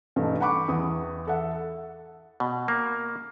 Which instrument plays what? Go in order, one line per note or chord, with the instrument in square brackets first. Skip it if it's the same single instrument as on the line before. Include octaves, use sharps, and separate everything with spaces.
[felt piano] G2 B2 E3 A3 D#4
F#5 G5 B5 C#6 D6 F#6
E2 E3 D#6
A4 E5 F#5
[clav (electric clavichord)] B2
A#3